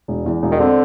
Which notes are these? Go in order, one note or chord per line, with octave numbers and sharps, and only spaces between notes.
E1
E2
E1
D#3
D3 C4